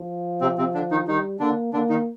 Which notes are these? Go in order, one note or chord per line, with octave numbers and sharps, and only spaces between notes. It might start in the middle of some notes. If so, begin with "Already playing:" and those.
Already playing: F3
C3 C4
C3 C4
D3 D4
D#3 D#4
D#3 G3 D#4
D3 A#3 D4
D3 A#3 D4
D#3 D#4